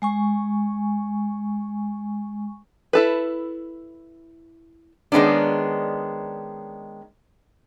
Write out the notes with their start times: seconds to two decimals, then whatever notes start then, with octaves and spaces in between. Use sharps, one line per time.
0.02 G#3 G#5 C#6
2.93 E4 A4 B4
5.12 D#3 G#3 B3 C#4 D4